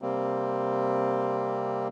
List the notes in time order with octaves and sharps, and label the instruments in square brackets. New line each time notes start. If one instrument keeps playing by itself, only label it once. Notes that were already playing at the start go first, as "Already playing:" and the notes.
[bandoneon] C3 G3 A#3 C4